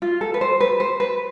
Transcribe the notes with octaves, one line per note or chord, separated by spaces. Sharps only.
F4
A4
B4
C5
B4
C5
B4